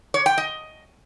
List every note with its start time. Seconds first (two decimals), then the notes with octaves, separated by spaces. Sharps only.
0.14 C#5
0.26 G5
0.38 D#5